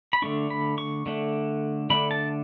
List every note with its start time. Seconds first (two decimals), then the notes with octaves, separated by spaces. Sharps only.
0.13 B5
0.22 D3 A3 D4 C#6
0.50 B5
0.78 C#6
1.06 D3 A3 D4
1.90 D3 A3 D4 B5
2.11 A5